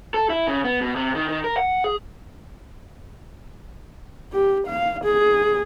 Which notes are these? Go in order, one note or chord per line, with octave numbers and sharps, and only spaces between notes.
A4
E4
C#3
B3
B2
C3
D#3
D#3
A#4
F#5
G#4
G4
F5
G#4